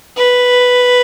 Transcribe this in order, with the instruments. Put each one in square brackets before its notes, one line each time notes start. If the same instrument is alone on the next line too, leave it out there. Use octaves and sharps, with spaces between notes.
[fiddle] B4